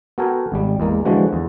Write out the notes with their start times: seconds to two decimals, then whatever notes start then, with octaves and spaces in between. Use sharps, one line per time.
0.18 B3 F#4 A4 A#4 G5 G#5
0.52 G#1 G3
0.80 E2 G#3 A#3
1.05 D3 E3 F3 G#3 F#4
1.33 E2